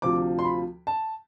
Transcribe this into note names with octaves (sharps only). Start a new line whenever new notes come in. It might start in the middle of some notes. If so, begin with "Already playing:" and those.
D2 C3 F3 D6
C6
B5
A5